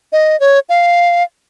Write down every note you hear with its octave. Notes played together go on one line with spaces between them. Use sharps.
D#5
C#5
F5